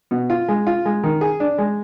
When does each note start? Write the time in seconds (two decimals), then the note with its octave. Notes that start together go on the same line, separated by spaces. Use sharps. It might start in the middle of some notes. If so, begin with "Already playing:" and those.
0.11 B2
0.30 F4
0.48 G#3
0.67 F4
0.85 G#3
1.03 D#3
1.21 G#4
1.40 D4
1.58 G#3